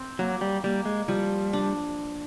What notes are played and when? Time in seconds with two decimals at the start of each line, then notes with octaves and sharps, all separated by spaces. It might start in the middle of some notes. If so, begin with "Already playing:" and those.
Already playing: C4
0.19 F#3 A#3
0.41 G3
0.64 G3 A#3
0.85 G#3
1.08 F3 G3
1.53 D4